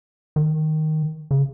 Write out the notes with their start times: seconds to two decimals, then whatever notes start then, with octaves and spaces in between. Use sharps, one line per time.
0.36 D#3
1.31 C#3